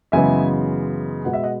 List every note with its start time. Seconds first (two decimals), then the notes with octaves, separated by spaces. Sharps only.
0.12 F#2 C#3 E3 G#3 B3 E5 G#5
1.25 B2 G#3 B3 F#5
1.33 E5
1.43 D#5 F#5